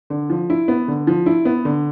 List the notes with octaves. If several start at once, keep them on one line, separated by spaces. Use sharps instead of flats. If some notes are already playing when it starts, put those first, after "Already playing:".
D3
F3
E4
B3
D3
F3
E4
B3
D3